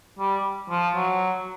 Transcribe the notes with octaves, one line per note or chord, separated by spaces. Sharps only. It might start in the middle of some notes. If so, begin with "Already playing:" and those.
G3
F3
F#3